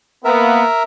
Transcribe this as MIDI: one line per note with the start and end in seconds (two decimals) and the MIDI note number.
0.25 0.63 58
0.25 0.63 59
0.25 0.83 70
0.25 0.83 76